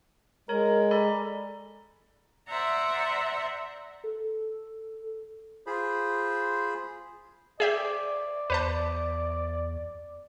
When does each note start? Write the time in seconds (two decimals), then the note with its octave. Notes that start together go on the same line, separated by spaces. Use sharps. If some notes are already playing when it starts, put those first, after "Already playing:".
0.49 G#3 A#4 C#5
0.91 A4 D5 A#5 B5
2.47 C5 D5 E5 F#5 A#5
4.04 A4
5.67 F4 G#4 C5 B5
7.60 G#4 D5 E5 G5
8.50 E2 B4 C5 A5